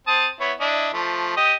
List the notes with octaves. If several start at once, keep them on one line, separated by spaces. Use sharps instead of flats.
C4 A5 D#6
B3 E4 C#5
D4 E4 D#5
F3 A3
G4 D#5 D#6